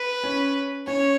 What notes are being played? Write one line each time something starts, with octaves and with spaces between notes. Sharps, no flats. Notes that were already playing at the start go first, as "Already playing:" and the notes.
Already playing: B4
C#4
C#4 C#5